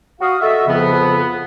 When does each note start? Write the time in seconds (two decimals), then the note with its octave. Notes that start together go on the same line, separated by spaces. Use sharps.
0.21 F#4 F5 D#6
0.41 F#4 A4 D#5 E5
0.67 F2 C#3 F3 B3